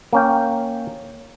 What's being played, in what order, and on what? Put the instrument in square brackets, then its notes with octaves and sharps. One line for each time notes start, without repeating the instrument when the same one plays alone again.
[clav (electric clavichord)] A#3 C#4 G5